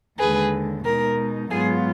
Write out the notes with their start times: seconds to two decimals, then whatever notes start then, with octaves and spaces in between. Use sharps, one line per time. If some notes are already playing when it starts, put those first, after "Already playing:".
0.19 D#2 D3 G#3 G#4 B4
0.84 B2 G#3 D#4 A#4
1.50 G#2 F#3 B3 F4 G#4